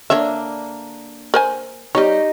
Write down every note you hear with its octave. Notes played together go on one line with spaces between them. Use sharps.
D3 A#3 D4 C#5 E5
A#4 C5 G#5
G3 D#4 G4 C#5 D#5